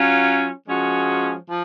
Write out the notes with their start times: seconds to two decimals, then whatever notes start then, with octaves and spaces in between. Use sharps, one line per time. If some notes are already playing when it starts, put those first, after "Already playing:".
Already playing: F#3 C#4 F4
0.67 F3 G#3 C#4 F#4
1.49 F3